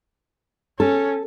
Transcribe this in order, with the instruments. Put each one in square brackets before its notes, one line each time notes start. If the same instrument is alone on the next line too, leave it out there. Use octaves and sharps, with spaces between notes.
[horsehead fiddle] C#4 [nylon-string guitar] A4